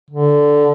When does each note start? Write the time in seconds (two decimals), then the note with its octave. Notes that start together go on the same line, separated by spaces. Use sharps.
0.10 D3